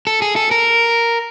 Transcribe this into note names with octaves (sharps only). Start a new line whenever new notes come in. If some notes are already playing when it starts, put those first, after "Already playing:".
A4
G#4
A4
A#4